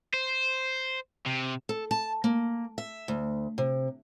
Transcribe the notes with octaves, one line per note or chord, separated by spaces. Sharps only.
C5
C3
A4
A5
A#3
E5
D2
C3